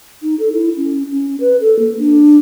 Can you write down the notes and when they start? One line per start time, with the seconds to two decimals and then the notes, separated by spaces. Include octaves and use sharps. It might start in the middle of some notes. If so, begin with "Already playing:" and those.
0.22 D#4
0.39 A4
0.53 E4
0.77 C#4
1.10 C#4
1.40 B4
1.61 A4
1.79 A#3
1.99 D4